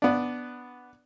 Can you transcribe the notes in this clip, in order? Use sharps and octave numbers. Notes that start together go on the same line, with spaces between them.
B3 D4